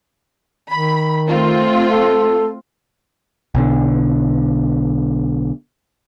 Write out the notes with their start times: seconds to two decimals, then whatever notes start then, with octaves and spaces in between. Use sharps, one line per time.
0.71 D#3 B5
1.28 A3 C4 F4
1.88 A4
3.55 B1 B2 D3